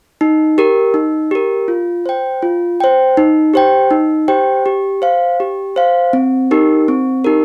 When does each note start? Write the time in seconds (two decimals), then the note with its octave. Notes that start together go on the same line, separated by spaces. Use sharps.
0.21 D#4
0.58 G4 A#4
0.94 D#4
1.31 G4 A#4
1.68 F4
2.06 C5 G5
2.42 F4
2.80 C5 G5
3.17 D#4
3.53 G4 C5 G5
3.91 D#4
4.28 G4 C5 G5
4.66 G4
5.02 C5 F5
5.40 G4
5.76 C5 F5
6.13 C4
6.51 D#4 G4 A#4
6.88 C4
7.24 D#4 G4 A#4